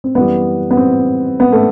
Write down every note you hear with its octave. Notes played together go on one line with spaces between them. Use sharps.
C4
F#2 E3 G3 B3
B3
C4
B3
A3